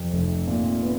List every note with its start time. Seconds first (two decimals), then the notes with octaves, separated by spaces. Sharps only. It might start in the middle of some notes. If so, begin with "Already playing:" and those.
Already playing: F2 C3
0.13 F1
0.47 A#2
0.83 B3